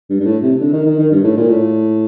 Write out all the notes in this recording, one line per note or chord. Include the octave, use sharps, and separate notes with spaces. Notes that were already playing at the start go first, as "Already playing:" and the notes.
G2
G2
A2
C3
D3
D#3
D#3
D#3
G2
A2
A#2
A2